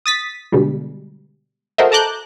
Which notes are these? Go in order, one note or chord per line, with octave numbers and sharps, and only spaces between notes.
D#6 A6 B6
B2 D3 G3 G#3
F#4 A4 A#4 C5 D#5 E5
A4 A5 A#5 D6 F#6 G6